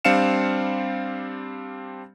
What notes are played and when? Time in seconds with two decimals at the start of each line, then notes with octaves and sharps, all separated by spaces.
0.05 G3 C4 D4 F5 C#7 E7